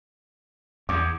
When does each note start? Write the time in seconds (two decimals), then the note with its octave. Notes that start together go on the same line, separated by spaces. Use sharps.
0.89 E2 D6